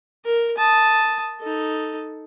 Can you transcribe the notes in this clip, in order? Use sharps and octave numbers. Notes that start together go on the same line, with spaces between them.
A#4
A5 D#6
D#4 A4